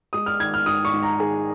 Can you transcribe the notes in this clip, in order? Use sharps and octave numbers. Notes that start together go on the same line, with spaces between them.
G#3 D#6
F6
D#3 G#6
F6
G#2 D#6
C#6
G#2
A#5
D#3 G#4